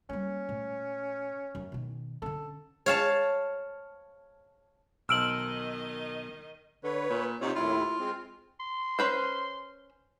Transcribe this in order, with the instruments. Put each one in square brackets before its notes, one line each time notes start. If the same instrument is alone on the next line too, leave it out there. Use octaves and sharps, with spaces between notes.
[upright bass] G3 A#3 [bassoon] C#4
[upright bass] A#2 A3
F#2
B2 D#3
[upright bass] D3 C#4 [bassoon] A4
[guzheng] C#5 F5 A5
[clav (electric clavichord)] B1 C5 [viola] D#3 D#5 [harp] E6 [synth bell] F6 D7 F#7
[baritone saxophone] D3 [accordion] B4 C#5
[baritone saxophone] A#2
[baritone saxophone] C3 [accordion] D#4 F4 C#5
[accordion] D#2 A2 E4 [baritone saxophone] F4
[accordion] G#3 C4
[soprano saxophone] C6
[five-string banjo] C#4 B4 C5